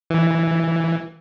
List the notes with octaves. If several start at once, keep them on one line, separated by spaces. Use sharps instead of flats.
E3